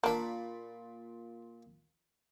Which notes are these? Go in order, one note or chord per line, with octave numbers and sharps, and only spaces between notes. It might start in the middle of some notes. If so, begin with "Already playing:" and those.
A#2 A#3 D4 D5 B5